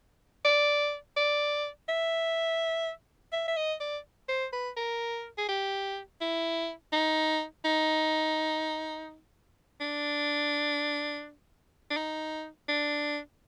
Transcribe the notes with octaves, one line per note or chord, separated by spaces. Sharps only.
D5
D5
E5
E5
E5
D#5
D5
C5
B4
A#4
G#4
G4
E4
D#4
D#4
D4
D4
D#4
D4